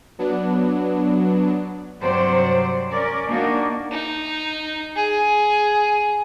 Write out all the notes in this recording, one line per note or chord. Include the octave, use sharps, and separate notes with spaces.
F#3 B3 D4
G2 C3 F#3 C5 D5
C#4 A#4 D5
A#3 D4 D#4 F#4
D#4
G#4